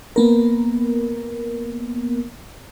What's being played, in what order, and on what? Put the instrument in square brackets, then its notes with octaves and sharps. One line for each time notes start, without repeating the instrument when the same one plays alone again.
[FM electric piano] A#3 B3 A#4